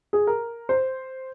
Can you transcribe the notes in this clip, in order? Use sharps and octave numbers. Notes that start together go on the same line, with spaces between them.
G#4
A#4
C5